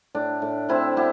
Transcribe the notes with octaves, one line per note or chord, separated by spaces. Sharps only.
A2 D4
A2
A2 C4 E4
B3 E4 G4